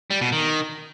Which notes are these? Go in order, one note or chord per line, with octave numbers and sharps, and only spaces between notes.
G3
B2
D#3